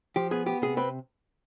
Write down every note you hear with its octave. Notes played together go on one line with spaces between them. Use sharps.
F3 G4
B3 G#4
B3 G4
C3 G#4
C4 B4